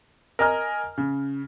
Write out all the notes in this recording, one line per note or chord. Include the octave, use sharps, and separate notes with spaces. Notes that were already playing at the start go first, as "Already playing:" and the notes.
A#4 D#5 G#5 A#5 F6
C#3